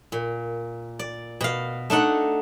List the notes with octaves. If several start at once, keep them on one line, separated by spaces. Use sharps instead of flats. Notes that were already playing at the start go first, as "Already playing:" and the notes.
A#2
D5
B2 F5
A3 D4 D#4 F#5